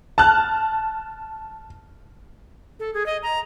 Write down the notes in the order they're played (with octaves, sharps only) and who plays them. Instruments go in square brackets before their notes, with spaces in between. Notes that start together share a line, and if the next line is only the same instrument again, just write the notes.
[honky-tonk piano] A5 F6 F#6
[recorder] A4
G#4
D#5
A#5